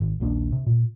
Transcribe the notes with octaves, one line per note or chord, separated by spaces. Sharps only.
G#1
A#1 D#2 A#3 D4
C3
A#2